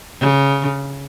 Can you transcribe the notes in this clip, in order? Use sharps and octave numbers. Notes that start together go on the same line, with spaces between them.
C#3